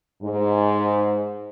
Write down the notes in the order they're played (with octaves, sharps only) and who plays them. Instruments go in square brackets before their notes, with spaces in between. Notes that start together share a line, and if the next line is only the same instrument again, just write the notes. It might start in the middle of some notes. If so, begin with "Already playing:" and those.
[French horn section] G#2